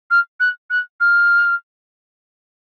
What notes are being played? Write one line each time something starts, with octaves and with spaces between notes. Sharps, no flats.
F6
F#6
F#6
F6